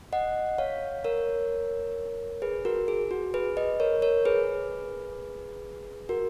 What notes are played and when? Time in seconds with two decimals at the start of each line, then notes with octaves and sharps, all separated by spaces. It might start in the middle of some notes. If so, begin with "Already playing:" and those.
0.13 D#5 F#5
0.58 C#5 F5
1.04 A#4 C#5
2.42 G#4 B4
2.65 F#4 A#4
2.88 G#4
3.11 F#4
3.34 G#4 B4
3.57 B4 D#5
3.80 A#4 C#5
4.02 A#4 C#5
4.25 G#4 B4
6.09 F#4 A#4